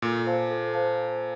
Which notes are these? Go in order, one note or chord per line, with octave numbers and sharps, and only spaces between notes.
A#2 A4
C5 F5 A5
A4
C5 F5 A5